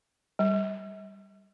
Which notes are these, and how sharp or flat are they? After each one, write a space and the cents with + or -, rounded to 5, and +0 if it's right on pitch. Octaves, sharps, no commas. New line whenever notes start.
G3 +0